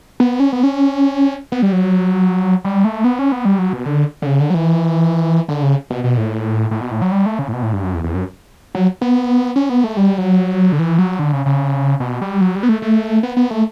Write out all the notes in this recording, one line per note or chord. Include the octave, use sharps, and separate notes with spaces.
B3
C#4
B3
C#4
B3
G3
F#3
G3
A3
B3
C#4
B3
G3
F#3
B2
D3
D3
C#3
D3
F#3
E3
D3
C#3
B2
B2
A2
A2
B2
A2
F#3
G3
A3
C#3
A2
B2
A2
G2
F#2
E2
E2
F#2
F#3
B3
C#4
B3
A3
G3
F#3
D3
E3
F#3
D3
C#3
C#3
B2
G3
F#3
G3
B3
A3
A3
B3
B3
A3